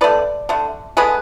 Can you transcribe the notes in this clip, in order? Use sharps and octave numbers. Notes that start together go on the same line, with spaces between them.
D3 A3 B4 D5
D3 A3
D3 G#3 B3 G#4 B4